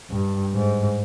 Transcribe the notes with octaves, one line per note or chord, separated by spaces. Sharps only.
G2
G#2